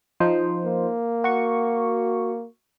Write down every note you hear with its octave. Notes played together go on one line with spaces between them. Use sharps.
F3 D#4 C5
A#3
F#4 C#6